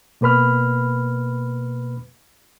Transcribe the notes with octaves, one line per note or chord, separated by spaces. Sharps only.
B2 A#3 B4 B5 F6